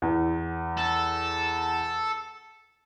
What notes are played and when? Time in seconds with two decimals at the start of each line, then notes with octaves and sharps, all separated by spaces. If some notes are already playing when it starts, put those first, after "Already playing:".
0.02 E2
0.77 A4